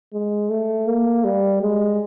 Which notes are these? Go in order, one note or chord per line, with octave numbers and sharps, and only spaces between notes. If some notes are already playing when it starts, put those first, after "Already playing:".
G#3
A3
A#3
G3
G#3